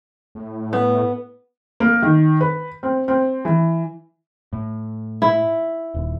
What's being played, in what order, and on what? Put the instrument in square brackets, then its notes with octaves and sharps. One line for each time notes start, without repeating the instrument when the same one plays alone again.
[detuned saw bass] A2
[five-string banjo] B3
[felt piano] A#3
D#3
B4
C4
C4
E3
[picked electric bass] A2
[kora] E4
[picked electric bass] D#1